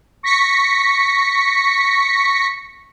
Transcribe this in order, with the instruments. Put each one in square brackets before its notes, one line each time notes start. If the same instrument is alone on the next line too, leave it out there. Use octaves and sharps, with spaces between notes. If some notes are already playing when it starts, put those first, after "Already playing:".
[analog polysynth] C#6 A#6 B6 C#7